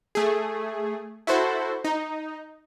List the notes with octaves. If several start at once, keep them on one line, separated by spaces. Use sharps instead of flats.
A3 G#4
E4 F#4 A4 C5
D#4